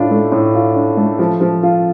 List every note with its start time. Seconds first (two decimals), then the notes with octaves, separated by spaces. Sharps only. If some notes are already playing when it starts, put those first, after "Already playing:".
Already playing: A2 D4 F4
0.11 A3
0.32 A2
0.55 F4
0.75 D4
0.97 A3
1.19 F3
1.41 F3
1.63 F4